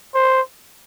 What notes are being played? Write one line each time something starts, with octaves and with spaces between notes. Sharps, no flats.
C5